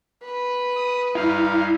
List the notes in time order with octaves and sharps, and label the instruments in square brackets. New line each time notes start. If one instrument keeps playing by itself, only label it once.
[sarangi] B4
[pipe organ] D#6
[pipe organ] G2 D#4 F5 [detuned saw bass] E4